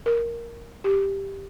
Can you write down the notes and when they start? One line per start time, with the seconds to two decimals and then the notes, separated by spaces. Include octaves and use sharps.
0.06 A#4
0.84 G4